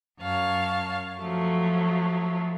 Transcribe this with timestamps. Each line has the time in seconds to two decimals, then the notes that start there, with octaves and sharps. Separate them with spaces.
0.21 F#2 C#5 F5 A5
1.19 F3 F#3 A3